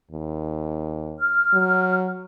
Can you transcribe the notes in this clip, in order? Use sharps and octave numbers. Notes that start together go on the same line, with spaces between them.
D#2
F6
F#3